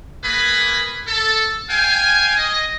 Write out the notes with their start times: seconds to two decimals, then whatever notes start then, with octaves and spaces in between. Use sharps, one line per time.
0.24 A#3 G#4 B4 B5
1.07 A4
1.70 F5 G5 G#5
2.37 D#5